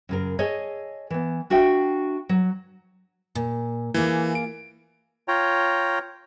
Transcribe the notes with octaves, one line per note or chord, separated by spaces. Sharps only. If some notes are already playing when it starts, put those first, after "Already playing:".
F#2 C#3 A#4
G#4 A4 C#5 D#5
E3 B3
D4 F#4 E5 F5 G5
F#3
A#2
E3 A#3 F4 G#4
D7
F4 C#5 G5 A#5